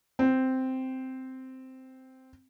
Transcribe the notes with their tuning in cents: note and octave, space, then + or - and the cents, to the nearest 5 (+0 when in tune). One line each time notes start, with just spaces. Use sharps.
C4 -5